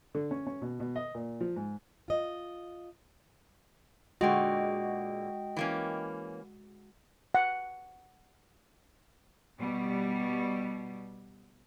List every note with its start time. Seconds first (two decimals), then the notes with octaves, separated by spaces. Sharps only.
0.15 D3
0.31 C#4
0.47 C#4
0.62 B2
0.80 B2
0.96 D#5
1.15 A#2
1.41 F3
1.56 G#2
2.08 F4 D#5
4.21 A#2 D3 G#3 F#4 D#5 G5
5.57 E3 A#3 C#4
7.35 F#5
9.59 B2 G3